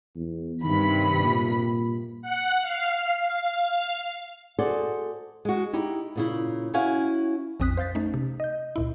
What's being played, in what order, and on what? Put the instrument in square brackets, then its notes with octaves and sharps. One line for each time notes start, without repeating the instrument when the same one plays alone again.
[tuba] E2
[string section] G2 C3 B5 [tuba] D#3
[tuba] A#2
[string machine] F#5
F5
[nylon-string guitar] F#4 G#4 A4 C5 D5
G#3 F#4
D#4 E4 G4
A#2 C#3 E4
C#4 E4 F#4 F5 G#5
[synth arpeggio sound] A#1 F2 C4 D#6 F#6 B6
C5 F5 G6 A6 B6
A3 C#4 D#4
C3
D#5 G6
C#2 A#2 E4